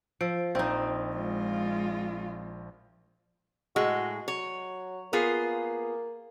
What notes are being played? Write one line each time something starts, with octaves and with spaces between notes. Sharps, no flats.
F3 E6 D7
A#1 F3 C4 D#4
G#3 F4
A2 G#3 F#4
F#3 C#5
A#3 B3 F4 G#4